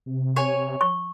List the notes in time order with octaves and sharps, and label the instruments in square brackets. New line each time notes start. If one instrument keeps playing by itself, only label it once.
[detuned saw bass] C3
[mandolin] C#5 G#5
[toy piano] C#6